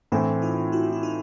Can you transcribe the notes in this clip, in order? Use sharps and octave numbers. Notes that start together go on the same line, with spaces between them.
A2 E3 A3 C4 D4 E4
D#4 F4
E4 F#4
E4
D#4 F4